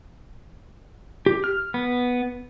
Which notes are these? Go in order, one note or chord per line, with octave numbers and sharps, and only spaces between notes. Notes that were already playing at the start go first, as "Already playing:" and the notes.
G4
F6
B3